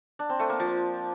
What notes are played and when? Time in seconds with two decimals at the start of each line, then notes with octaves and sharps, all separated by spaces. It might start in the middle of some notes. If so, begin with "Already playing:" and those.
0.19 D4
0.29 C4
0.39 A3
0.50 A#3
0.60 F3